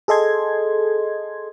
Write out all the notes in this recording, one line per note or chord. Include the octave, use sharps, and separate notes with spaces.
G#4 A4 D#5 C6 G#6